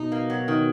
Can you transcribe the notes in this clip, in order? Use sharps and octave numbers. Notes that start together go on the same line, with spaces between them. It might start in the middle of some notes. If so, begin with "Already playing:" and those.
Already playing: B2 D#4
A#3
F#3
D#3